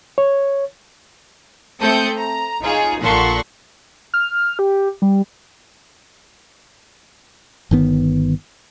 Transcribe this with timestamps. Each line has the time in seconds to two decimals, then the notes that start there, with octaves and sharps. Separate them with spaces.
0.18 C#5
1.80 A3 C4 A4 D#6 G6 C#7
2.16 A#5
2.61 D#4 F4 G#4 C#5
3.00 A#1 A#2 A4 F#5 C6 C#6
4.14 F6
4.59 G4
5.02 G3
7.71 G1 D#3 B3